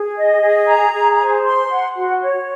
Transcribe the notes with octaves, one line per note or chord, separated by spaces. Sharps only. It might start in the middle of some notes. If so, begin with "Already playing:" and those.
Already playing: G#4
D#5
G#4
A#5
G#4
C5
C6
F#5
F#4
C#5